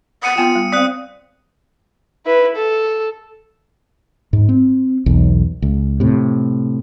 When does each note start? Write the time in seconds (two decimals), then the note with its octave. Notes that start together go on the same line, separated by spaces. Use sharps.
0.23 F#5 D#6 C#7 D#7
0.38 B3 F4 G5
0.55 G3
0.72 C4 D5 F5 D#6 F#6
2.26 E4 B4
2.56 A4
4.33 G#2
4.49 C4
5.06 B1 E2
5.62 C#2
6.00 A2 C3